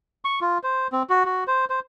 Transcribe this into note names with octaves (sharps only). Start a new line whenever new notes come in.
C#6
F4
C5
C4
F#4
F#4
C5
C5